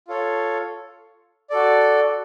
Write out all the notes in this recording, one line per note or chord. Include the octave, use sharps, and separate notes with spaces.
F4 A4 C#5
F#4 A4 D5